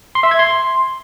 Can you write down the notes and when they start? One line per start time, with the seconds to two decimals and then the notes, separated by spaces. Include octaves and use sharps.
0.15 C6
0.23 E5
0.31 G#6
0.39 C6